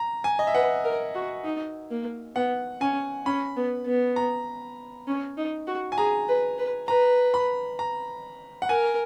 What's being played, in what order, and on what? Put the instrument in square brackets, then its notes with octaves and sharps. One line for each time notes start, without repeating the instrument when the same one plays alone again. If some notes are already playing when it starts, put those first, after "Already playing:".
Already playing: [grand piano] A#5
G#5
D#5
E5
[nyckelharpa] B4 [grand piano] F#5
[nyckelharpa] A#4
F#4
D#4
A#3
[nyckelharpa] B3 [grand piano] F#5
[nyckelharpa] C#4 [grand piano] G#5
[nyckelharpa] C#4 [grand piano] B5
[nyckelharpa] B3
B3
[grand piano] A#5
[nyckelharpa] C#4
D#4
F#4
[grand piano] G#5
[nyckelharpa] G#4 [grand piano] A#5
[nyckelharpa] B4
B4
[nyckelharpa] B4 [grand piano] A#5
[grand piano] B5
A#5
F#5
[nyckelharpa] A#4 [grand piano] G#5